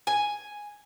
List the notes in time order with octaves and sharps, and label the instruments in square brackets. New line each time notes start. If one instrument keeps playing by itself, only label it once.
[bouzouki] G#5